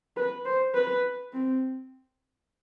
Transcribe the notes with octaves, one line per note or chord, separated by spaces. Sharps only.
B4
C5
B4
C4